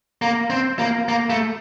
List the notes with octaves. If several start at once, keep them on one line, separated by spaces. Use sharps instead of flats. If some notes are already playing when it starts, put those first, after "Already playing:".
A#3
C4
A#3
A#3
A3